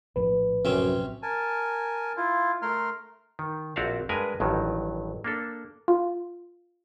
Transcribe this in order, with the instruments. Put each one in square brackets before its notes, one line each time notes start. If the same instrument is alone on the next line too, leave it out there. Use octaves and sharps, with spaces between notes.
[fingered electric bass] A#1 A2 F3 [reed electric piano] B4
[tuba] F#2 [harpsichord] C3 C4 C#4
[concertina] A#4 G#5 A5
E4 F4
A3 A#4 A#5 C6 F6
[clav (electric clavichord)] D#3
A#1 C4 F#4 D5 E5 F5
G2 G#3 A#4 B4 G#5
A1 G2 D#3 F#3
A#3 D4 A4
[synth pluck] F4